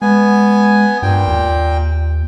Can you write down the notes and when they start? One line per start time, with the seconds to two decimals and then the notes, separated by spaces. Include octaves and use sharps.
0.02 G#3 B3 G#5
1.02 G2 A#2 G5
1.27 D#2